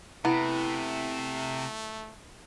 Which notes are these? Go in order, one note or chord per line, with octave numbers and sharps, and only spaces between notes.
C3 A3 B3 E4